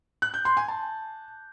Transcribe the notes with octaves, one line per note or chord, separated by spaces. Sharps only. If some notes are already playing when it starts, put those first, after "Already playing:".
F#6
G6
C6
G#5
A5